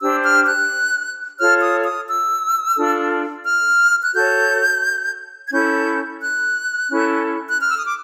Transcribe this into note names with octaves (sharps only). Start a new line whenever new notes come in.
D4 G4 C5 E6
F6
F#6
F4 A4 C#5 F6
D#6
D#6
E6
D4 F4 A4
F6
F#6
F#4 A4 C#5 G6
G#6
C#4 E4 A4 G6
F#6
C#4 E4 A4
F#6
F6
E6
D#6
D6